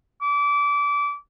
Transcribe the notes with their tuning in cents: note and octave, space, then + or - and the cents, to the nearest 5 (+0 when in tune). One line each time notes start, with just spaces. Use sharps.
D6 -25